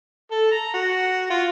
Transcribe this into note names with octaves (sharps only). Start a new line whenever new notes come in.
A4
A#5
F#4
F4